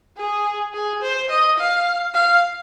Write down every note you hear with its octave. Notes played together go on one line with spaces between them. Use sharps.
G#4
G#4
C5
D#5
F5
F5